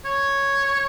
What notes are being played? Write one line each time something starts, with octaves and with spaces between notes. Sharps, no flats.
C#5